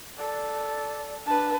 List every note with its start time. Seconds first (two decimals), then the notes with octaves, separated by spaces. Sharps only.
0.18 A4 D5
1.27 D4 B4 A5